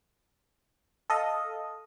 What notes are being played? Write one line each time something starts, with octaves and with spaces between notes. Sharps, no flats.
A4 D#5 F5